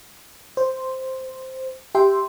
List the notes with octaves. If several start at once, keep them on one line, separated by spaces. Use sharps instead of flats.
C5
G4 E5 G5 C6